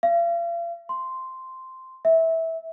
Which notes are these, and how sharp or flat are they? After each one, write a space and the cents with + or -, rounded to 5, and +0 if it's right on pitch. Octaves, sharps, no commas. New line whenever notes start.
F5 -40
C6 -5
E5 -15